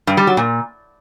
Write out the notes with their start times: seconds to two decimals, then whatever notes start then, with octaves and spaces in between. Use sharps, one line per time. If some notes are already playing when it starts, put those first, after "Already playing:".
0.07 G2
0.17 G3
0.27 F#3
0.37 A#2